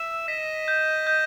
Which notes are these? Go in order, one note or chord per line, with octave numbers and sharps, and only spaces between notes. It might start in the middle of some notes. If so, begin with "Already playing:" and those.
Already playing: E5 E7
D#5 B6
G6
G6